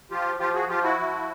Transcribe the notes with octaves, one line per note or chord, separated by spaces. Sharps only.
F3 F4 G4
F3 F4 G4
F#4 G#4
F3 F4 G4
E4 F#4
F3